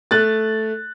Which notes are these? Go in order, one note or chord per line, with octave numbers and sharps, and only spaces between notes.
A3 F#6 A6